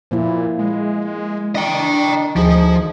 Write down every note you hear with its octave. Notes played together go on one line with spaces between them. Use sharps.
A#2 F3 A#3 E4
G#3
D4 D#5 G5
D2 F3 D#4 G#4